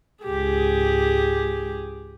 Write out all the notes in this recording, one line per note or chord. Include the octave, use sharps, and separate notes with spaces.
C#2 G#2 G4 G#4